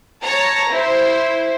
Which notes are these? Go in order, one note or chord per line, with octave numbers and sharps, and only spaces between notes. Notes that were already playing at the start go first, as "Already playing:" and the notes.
C#5 A5 A#5
E4 C5